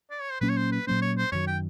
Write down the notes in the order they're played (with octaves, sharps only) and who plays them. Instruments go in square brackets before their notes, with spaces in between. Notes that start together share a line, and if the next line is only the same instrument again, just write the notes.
[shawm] D5
C#5
C5
[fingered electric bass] A#2 F#3 A#3 C#4 [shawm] B4
[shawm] C#5
C5
B4
[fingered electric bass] A#2 F#3 A#3 C#4 [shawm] C5
[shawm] C#5
C5
[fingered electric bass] F#2 D#3 F#3 [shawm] C#5
[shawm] G5